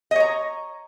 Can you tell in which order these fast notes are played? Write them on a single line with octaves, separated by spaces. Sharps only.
D#5 C#5 A#5